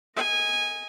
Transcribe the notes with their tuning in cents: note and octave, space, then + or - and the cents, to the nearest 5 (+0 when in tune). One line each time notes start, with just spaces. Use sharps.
D#5 +20 G#5 -15